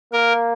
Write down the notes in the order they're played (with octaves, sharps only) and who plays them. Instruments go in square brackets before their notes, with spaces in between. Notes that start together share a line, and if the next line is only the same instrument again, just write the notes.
[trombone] A#3 [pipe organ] A#4